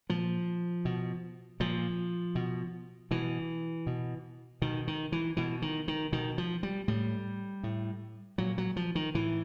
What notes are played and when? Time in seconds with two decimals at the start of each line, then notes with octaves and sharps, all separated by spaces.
0.09 A#2 F3
0.85 B2
1.60 A#2 F3
2.35 B2
3.11 B2 E3
3.87 B2
4.62 B2 D#3
4.88 D#3
5.12 E3
5.37 B2 E3
5.62 D#3
5.88 D#3
6.12 B2 D#3
6.38 F3
6.63 G3
6.88 A2 G3
7.63 A2
8.38 A#2 F#3
8.58 F#3
8.76 F3
8.95 D#3
9.15 A2 E3